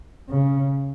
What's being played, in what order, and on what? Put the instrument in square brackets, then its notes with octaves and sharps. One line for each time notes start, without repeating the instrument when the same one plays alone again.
[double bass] C#3